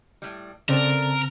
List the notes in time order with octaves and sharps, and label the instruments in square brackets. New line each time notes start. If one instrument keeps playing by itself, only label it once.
[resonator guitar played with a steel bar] A2 G3
[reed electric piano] C#3 C4 [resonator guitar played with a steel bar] A3 A4 D5 [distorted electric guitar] A#4